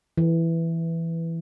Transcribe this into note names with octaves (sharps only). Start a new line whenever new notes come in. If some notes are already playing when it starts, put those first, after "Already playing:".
E3